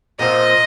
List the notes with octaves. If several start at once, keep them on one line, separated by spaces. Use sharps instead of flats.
A#2 F3 A3 C4 D#5